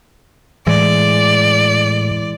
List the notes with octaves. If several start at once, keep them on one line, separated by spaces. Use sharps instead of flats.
A2 E3 G#3 D5